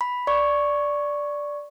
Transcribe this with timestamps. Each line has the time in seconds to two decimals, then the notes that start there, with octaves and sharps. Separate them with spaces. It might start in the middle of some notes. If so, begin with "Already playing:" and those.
0.01 B5
0.27 D5 C#6